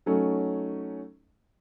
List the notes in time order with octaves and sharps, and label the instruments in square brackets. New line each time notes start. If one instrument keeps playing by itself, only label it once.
[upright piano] F#3 A3 C#4 D#4